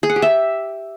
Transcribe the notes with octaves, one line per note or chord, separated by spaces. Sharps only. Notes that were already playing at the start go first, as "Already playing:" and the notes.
G#4
F#5
G4
E5